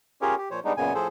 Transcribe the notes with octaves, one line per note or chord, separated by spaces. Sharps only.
C#4 F4 G4 G#4 A#4 C#5
G4
A#2 F3 C5 C#5
G3 G#3 B3 D4 D#4
F#2 A#2 C#3 B3 G#5
A2 F3 G#4 A4 C5